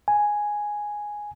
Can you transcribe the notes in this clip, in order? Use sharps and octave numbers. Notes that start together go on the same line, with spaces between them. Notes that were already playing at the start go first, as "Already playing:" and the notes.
G#5